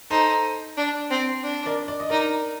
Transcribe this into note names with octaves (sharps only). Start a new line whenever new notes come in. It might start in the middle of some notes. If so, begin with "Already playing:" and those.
D#4 A4 C5
D4
C4
D4
A#4 D5
D5
D#5
D#4 A#4 D5